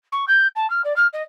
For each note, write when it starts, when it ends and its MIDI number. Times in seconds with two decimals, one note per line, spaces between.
0.12 0.25 85
0.28 0.47 91
0.56 0.69 81
0.70 0.82 89
0.84 0.95 74
0.96 1.07 89
1.13 1.22 75